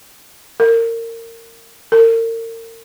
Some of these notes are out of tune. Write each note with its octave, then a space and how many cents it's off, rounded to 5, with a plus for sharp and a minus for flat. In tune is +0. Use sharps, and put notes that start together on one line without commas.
A#4 -25
A#4 -40